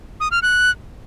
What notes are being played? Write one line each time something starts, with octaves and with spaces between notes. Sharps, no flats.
D#6
F6
F#6